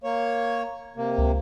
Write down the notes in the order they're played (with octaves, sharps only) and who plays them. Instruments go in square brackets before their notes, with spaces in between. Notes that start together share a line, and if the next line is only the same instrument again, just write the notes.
[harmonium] A#3 C#5
C3 A#3
[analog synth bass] C#2